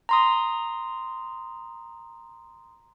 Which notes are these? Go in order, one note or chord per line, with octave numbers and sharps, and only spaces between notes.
A#5 C6 D#6